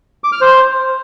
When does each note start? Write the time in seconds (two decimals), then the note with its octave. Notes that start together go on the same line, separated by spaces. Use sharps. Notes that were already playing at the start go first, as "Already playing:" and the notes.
0.24 D6
0.32 F6
0.41 C5